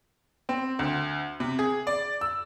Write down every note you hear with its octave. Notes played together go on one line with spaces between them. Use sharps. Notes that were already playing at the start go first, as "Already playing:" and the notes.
C4
D2
C3
G#4
D5
E6